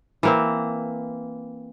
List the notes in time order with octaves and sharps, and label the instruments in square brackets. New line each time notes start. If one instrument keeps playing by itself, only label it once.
[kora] E3 A#3 C4